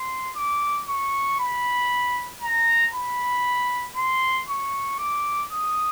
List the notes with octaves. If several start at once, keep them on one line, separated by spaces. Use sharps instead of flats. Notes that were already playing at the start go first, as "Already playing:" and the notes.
Already playing: C6
D6
C#6
B5
A#5
B5
C6
C#6
D6
D#6